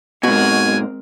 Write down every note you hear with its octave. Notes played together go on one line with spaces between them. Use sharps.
G#2 B2 G#3 C4 F#4 A#4 G#5